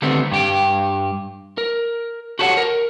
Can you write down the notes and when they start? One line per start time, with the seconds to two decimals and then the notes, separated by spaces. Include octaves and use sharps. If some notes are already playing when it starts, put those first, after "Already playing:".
0.02 D3 D#3 G3 A3 B3 C4
0.31 G2 G4 G5
1.58 A#4
2.39 F#4 G4 A4 C#5 E5 F#5
2.57 A#4